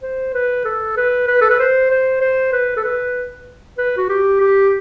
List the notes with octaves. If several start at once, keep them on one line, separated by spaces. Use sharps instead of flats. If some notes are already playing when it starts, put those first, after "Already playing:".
C5
B4
A4
B4
B4
A4
B4
C5
C5
C5
B4
A4
B4
B4
F#4
G4
G4